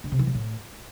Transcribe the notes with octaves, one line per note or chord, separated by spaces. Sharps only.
D3
C3
E3
C3
A2